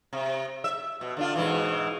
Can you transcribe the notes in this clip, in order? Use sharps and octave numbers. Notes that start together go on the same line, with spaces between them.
C3
E5
B2
D3 D4 F4
G#2 B2 E3